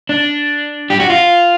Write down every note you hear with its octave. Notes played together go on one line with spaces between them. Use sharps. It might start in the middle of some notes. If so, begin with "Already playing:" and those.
D4
G4
F#4
F4